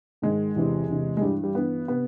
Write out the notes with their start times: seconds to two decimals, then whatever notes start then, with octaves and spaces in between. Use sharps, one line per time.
0.22 G#2 D#3 G#3
0.56 E2 C3 E3
0.89 E2 C3 E3
1.17 G#3
1.21 G2 E3 G3
1.44 G3
1.55 G2 E3 B3
1.88 C3 B3